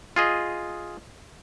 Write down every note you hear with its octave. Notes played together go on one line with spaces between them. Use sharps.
F4 G#4 D#5